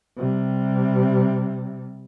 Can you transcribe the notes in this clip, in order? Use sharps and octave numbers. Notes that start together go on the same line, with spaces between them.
C3 G3